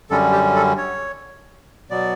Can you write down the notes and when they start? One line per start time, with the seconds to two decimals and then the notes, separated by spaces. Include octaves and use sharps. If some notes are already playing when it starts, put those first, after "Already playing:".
0.10 F#2 D3 G3 C#4 A4
0.32 G4
0.56 A4
0.78 C#5
1.90 B2 F#3 B3 D5